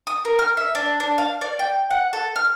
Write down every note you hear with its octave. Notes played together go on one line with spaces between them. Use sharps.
D#6
A#4
F6
E5
D4
D4
F5
D5
G5
F#5
A4
F6